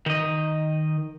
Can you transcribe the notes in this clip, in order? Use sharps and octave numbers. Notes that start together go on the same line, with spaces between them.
D#3 D#5